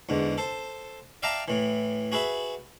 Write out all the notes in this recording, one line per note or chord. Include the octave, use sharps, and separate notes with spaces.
E2 G#2 D3
A4 C5
D5 E5 F5 G5 A5 A#5
A2 E3
F#4 G#4 B4 E5